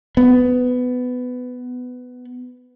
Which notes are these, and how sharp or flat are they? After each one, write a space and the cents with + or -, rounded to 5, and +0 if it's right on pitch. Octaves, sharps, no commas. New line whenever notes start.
B3 +15